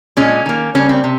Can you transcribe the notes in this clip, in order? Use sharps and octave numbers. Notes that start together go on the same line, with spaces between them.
A#2 G#3 C#4
D#3 A#3
C#3 G3 A#3 C#4
C4
C3